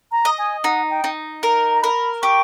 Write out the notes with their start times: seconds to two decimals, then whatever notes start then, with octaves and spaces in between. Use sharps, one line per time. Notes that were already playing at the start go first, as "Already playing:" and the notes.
0.12 A#5
0.25 D#5
0.38 G#5
0.64 D#4 F#5
0.90 G5
1.04 D#4
1.43 A#4 A#5
1.75 A#5
1.82 A#4 B5
2.22 G4 C#6